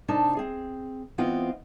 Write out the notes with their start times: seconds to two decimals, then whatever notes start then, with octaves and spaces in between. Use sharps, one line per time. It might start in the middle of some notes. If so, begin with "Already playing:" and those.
0.08 C3 D4 D#4 A#4 A5
0.37 C4 G#4
1.18 E3 B3 C4 F4 D#5 G5